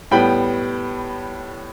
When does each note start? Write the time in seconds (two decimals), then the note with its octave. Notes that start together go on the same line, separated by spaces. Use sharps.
0.11 A2 G3 B3 G5 B5